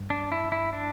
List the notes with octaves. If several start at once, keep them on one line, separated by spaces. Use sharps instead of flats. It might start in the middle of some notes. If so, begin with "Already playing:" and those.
Already playing: G2
D4
E4
E4
D4